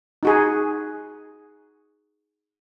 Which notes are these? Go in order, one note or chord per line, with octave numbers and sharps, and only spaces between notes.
D#4 F#4 G#4